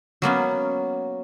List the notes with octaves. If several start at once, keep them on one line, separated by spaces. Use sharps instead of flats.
F#3 A#3 B3 C#4